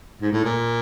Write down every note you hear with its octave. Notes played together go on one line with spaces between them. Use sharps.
G#2
A2
A#2